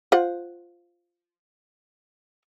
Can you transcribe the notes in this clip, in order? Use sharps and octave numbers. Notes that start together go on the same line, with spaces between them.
F4 C5 F#5